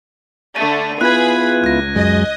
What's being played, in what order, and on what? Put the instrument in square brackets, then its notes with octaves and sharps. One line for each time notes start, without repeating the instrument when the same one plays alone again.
[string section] D3 A3 [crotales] D#7
[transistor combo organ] B3 E4 F4 [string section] G#4 B4 B5 [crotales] F#6 G#6
[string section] C#2 [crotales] F#6 A#6
[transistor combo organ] F#2 G#3 [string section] D#5